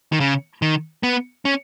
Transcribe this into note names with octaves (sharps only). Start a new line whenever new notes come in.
D#3
C#3
D#3
B3
C#4